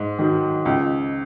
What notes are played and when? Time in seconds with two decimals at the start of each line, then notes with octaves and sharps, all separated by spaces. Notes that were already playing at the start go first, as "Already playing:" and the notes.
Already playing: G#2
0.19 D#3 F#3
0.65 C#2